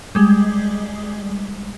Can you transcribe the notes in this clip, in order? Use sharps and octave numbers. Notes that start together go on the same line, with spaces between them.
G3 G#3